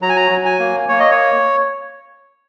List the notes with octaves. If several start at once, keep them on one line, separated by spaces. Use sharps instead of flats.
F#3 A#5
G#5
A#5
F#3
G#5
A#3
A#3 C#5
D#5
C#5